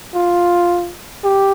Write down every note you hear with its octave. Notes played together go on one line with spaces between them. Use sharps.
F4
G4